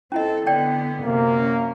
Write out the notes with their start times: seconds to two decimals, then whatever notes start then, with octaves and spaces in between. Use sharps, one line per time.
0.12 C4 C#4 E4 A4 D#5
0.47 D3 B3 C#5 D5 G5
1.03 F#2 C3 A#3
1.37 C#4